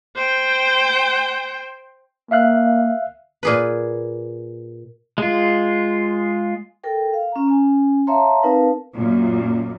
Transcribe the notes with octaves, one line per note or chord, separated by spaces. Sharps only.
C5 G5
A#3 E5 F5 F#6
A#2 G#4 B4
G#3 F4
A4 A#4 G5
F5
C#4 A#5
C#4 G#5
C#5 E5 F5 A5 A#5 C6
C4 D#4 A#4 B4 F5 A5
F#2 A#2